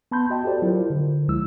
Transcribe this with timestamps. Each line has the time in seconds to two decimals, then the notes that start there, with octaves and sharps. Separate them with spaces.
0.12 B3 A5 B5 C6 G6
0.30 F#4 D#5 G5 A5
0.44 F#4 G4 A4 C5 D5
0.62 F#3 E4 F4 A#4 C5
0.90 D3
1.28 D2 F3 G#3 E4 E6